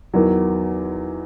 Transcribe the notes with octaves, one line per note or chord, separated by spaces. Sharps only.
E2 D#3 F#3